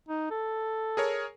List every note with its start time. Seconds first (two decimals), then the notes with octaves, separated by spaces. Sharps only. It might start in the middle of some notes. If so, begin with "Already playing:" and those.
0.09 D#4
0.30 A4
0.97 G#4 A#4 C#5